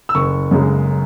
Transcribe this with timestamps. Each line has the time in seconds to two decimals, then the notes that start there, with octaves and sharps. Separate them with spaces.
0.09 E6
0.15 F#1 C#6
0.51 F#2 C#3 G#3